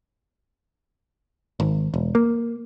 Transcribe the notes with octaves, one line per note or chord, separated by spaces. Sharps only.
G#1
E1
A#3